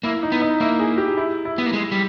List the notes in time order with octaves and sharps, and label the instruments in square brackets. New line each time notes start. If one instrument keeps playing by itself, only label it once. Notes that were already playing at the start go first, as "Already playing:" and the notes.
[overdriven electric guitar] A#3 [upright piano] E4
[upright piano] D#4
[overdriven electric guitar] B3
[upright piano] D#4
[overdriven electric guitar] A#3 [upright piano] E4
[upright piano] G#4
G4
E4
E4
[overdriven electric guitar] B3
A#3
G#3
G3